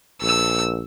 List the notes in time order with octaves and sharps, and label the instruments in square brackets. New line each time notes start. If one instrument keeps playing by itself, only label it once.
[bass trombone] A#1 [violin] E6